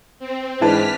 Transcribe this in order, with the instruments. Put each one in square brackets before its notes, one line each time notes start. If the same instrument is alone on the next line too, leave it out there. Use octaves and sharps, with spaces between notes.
[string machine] C4
[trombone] G#2 [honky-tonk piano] E3 D4 B4 [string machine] F6 B6